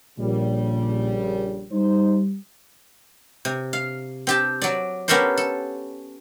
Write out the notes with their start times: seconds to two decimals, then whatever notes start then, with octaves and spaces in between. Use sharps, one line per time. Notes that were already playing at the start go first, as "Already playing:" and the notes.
0.19 A#1 A#2 C#3 G3
1.72 G3 D#4 C5
3.45 C3
3.73 F5
4.27 C4 G4 A5
4.62 F#3 D5
5.08 B3 C#4 G4 A4 A#4 C5
5.37 A4